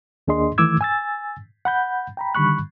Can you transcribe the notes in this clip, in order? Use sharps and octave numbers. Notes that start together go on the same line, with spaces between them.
D#2 A#3 D4 G#4 D#5 C6
D#3 E3 A3 D6 E6 G#6
G#5 E6 A6
F#5 B5 G6
G5 A#5 B5
D3 D#3 G3 B5 C#6 F#6